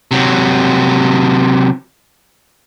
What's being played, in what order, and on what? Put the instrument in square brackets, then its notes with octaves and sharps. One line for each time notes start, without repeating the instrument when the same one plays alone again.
[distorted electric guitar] C3 F#3